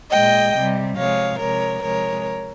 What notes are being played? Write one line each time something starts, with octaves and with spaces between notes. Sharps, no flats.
A#2 G#3 D#5 G5
C3 G3
C3 F3 G#3 C#5 F5
C3 F3 G#3 A#4 C#5
C3 F3 G#3 A#4 C#5